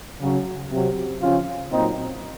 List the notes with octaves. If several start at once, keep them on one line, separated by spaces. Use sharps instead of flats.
C#3 F#3
C3 F#3
C#3 F3 C#4 F4
A#2 F#3 C4 D#4